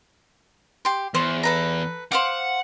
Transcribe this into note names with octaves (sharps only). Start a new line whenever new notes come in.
G4 C6
E2 C5 C#6
A4 B4 A#5
C5 F5 F#5 D6